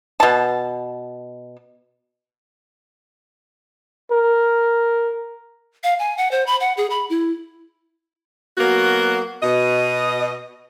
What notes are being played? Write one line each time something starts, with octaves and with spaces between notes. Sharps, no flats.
B2 A5
A#4
F5
G#5
F#5
C5
B5
F#5
G#4
B5
E4
F#3 A#3 B3 F#4
B2 D#5